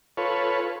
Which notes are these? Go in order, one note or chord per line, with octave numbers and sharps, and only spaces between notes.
F4 A4 B4 C#5